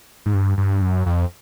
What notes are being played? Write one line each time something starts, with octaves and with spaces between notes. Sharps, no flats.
G#2
G2
G2
F#2
F2